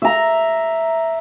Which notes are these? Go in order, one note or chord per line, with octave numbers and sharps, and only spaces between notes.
E5 A#5